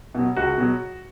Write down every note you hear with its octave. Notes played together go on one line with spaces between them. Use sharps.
B2 F#3
C#2 F#4
B2 F#3